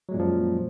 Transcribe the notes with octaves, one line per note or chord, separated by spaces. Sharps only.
F#2 A#2 F3 F#3 G#3